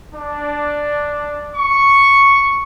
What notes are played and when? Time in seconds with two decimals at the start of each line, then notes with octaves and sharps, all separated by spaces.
0.13 D4
1.55 C#6